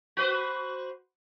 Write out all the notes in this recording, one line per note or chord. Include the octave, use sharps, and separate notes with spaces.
F#4 B4 C5